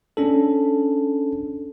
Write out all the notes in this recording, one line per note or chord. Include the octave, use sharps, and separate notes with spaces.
C#4 D4 A4